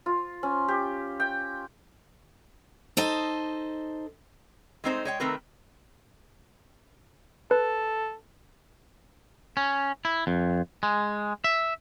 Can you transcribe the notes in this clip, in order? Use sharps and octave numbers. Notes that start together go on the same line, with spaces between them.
F4
C#4
G4
G5
D#4 A4 C5 D#5
G#3 A3 C4 D#4 B4 C5
G#3 C#5 G5
D#3 A3 C4 A#4 B4
A4 B4
C#4
E4
F2
G#3
E5